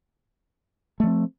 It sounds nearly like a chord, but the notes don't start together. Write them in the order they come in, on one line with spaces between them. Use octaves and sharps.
A3 F3 C4